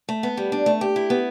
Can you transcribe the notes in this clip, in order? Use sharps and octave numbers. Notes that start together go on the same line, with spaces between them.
A3
B3
G3
D4
A3
G4
E4
B3